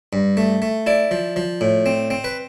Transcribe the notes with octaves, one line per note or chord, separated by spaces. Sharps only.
G2
A3
A3
E4 D5
F3
F3
A2
C4
C4
B4